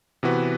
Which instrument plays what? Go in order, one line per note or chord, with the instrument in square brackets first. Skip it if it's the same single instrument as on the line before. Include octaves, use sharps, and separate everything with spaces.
[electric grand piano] C3 E3 B3 F#4 B4